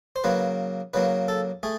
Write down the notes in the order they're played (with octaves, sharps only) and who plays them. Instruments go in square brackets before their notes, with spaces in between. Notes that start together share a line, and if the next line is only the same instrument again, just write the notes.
[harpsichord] C5
C#3 F#3 A#3 B4
C#3 F#3 A#3 B4
A4
A3 G#4